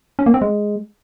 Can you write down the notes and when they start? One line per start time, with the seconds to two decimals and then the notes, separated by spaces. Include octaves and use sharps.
0.19 C#4
0.26 A#3
0.34 C4
0.42 G#3